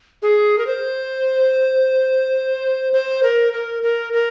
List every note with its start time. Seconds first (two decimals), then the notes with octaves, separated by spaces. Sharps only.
0.22 G#4
0.58 A#4
0.67 C5
2.93 C5
3.23 A#4
3.53 A#4
3.83 A#4
4.13 A#4